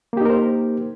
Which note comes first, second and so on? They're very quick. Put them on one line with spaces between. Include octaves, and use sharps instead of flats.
A#3 G4 D#4 A#4 C5